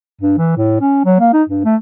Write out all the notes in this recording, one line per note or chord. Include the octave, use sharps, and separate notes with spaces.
G2
E3
A2
C#4
F#3
A#3
D#4
G2
A3